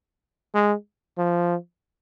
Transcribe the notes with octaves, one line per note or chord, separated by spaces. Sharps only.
G#3
F3